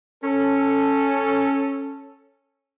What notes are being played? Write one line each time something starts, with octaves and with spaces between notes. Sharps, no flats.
C#4 A4